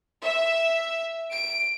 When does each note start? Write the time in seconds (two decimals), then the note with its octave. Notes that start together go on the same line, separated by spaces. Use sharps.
0.22 E5
1.31 D7